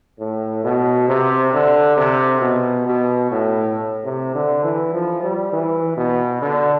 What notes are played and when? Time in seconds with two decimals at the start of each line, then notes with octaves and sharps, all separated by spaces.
0.20 A2
0.64 B2
1.08 C3
1.53 D3
1.97 C3
2.42 B2
2.86 B2
3.31 A2
4.05 C3
4.34 D3
4.64 E3
4.93 F3
5.23 G3
5.53 E3
5.97 B2
6.42 D3